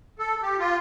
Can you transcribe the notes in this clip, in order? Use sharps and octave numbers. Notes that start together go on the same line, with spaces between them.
A4
G4
F4